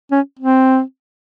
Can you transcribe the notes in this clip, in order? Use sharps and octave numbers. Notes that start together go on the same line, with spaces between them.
C#4
C4